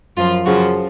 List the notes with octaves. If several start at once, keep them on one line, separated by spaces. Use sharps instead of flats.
F#2 F3 F4
F#2 C#3 F3 F#4